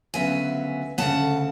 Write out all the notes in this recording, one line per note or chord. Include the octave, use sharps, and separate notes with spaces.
D2 C#3 F#3 B3 E5 G#5
D2 C#3 F#3 B3 F#5 A5